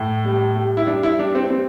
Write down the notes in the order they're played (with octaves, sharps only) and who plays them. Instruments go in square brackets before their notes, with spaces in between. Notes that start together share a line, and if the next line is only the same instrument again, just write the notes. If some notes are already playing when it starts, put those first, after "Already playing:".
Already playing: [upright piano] A2
G3
G3
E4
G3 D4
E4
G3 D4
C4
G3 C4